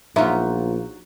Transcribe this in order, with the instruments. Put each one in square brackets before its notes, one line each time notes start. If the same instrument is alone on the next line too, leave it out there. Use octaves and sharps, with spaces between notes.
[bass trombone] A#1 [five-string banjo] F#3 D#4 E5 [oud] B3 F4